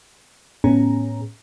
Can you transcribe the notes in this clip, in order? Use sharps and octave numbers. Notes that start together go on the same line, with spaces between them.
A2 B3 C#4 G#4 A#5